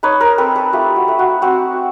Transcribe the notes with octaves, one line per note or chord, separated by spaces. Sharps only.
D#4 B4 C#5
A#4 C5
C4 A4 B4
A4 B4
A3 F4 G4
F#4
A3
F#4
C4 F#4